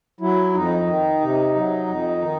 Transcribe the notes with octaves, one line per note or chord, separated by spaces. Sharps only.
F#3 E4
F2 D#4
D#3
C3
F#3
F2
D#3